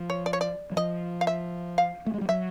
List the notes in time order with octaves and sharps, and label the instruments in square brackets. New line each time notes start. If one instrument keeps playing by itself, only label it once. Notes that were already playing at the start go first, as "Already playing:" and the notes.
Already playing: [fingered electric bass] F3
[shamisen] C#5
D5
C#5
D5
[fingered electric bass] F#3
[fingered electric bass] F3 [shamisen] D#5
[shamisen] F5
E5
F5
[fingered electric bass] A3
G#3
G3
[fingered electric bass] F#3 [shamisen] E5